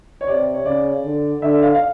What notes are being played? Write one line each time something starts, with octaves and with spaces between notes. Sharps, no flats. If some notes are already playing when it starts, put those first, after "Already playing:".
C#5
C3 D5
C#5
C#3 D5
D3
D3 E5
F5
F5